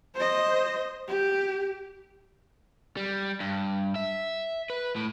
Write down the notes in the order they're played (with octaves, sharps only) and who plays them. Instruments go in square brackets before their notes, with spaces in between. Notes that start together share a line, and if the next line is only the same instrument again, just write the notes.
[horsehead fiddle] C5 D#5
G4
[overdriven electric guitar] G3
G2
E5
B4
A2